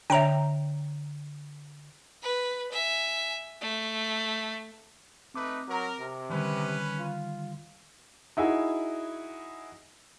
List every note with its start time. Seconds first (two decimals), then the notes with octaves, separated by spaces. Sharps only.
0.10 D3 D4 C#5 E5 G5 A#5
2.22 B4
2.72 E5 G#5
3.61 A3
5.34 A3 C4 D#4 B4 D6
5.69 F#3 A#4
5.99 C3
6.30 D3 D#3 G3 C#4 B4
6.99 F4
8.37 D#4 E4 F#4 G#4